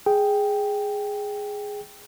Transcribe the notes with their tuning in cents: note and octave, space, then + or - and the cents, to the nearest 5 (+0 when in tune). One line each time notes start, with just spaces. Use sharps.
G#4 +0 G5 +0